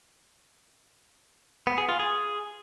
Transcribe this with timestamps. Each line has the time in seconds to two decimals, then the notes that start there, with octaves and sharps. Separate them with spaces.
1.67 B3
1.78 G#4
1.89 F4
1.99 G#4